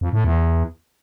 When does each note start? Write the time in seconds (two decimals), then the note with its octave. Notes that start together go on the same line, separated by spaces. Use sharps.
0.01 F2
0.13 A2
0.24 E2